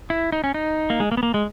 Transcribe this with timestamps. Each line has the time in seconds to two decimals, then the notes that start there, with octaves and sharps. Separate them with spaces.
0.10 E4
0.32 D#4
0.44 C#4
0.54 D#4
0.90 A#3
1.00 G#3
1.12 A#3
1.17 B3
1.23 A#3
1.34 G#3